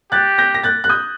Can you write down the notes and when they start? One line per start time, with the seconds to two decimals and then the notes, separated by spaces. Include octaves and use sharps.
0.12 G4 F#6 A6
0.38 G6 A#6
0.54 A#6
0.64 F#6 A6
0.84 F#6
0.89 D#6 G6